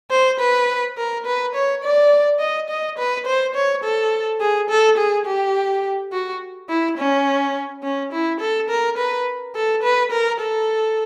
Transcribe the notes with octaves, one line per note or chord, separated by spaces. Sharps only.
C5
B4
A#4
B4
C#5
D5
D#5
D#5
B4
C5
C#5
A4
G#4
A4
G#4
G4
F#4
E4
C#4
C#4
E4
A4
A#4
B4
A4
B4
A#4
A4